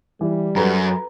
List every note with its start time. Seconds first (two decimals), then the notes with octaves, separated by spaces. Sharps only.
0.21 E3 G3
0.56 F#2 A4 B4 A#5